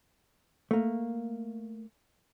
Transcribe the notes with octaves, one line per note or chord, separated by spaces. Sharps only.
A3 A#3